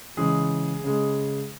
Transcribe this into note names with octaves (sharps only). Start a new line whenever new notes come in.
C#3 E3 G#3 G#4
C#3 G#3